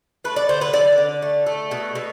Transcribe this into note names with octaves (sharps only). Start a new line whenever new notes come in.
A3 B4
D5
D3 C5
B4
D3 D5
D3
A3
A3
B2
B2